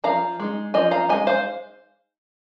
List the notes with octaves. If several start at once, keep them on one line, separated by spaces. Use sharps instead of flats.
F3 F5 A#5
G#3 D#4
F3 D#5 G#5
F5 A#5
G#3 D#4 D#5 G#5
C5 F5